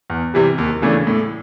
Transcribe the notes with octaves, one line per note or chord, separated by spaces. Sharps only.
E2
C3 E3 G3
D#2
C#3 E3 A3 D4
A2